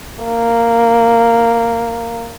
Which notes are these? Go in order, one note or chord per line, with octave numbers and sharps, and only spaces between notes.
A#3